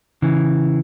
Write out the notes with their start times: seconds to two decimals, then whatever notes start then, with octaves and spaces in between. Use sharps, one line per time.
0.22 C#3 E3